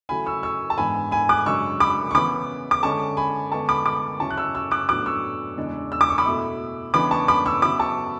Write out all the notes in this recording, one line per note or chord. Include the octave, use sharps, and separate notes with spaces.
C#3 F#3 A3 E4 G#5 B5
C#6 E6
C#6 E6
A5
G#2 E3 B3 D4 G#5 B5
G#5 B5
D6 F#6
F#2 C#3 G#3 D4 C#6 E6
B5 D6
C#6
C#3 E3 B3 B5 D6
D6
D3 G#3 C#4 A5 C#6
G#5 B5
D3 G#3 B3 A5 C#6
B5 D6
B5 D6
C#3 F#3 C#4 E4 A5 C#6
F#6
C#6 E6
C#6 E6
D6 F#6
A2 F#3 B3 D4 D6 F#6
C#6 E6
E2 C#3 G#3 D4
E6
D6
C#6
B5 D6
B2 A3 E4
C#3 E3 G#3 B3 D4 B5 D6
A5 C#6
B5 D6
C#6 E6
C#3 F#3 B3 E4 B5 D6
A5 C#6